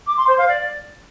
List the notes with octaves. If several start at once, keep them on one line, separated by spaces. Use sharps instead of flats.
D6
C6
C5
F5
D5